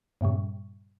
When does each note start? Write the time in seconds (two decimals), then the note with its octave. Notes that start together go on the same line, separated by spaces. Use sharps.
0.21 G2 A#2 C#3 G3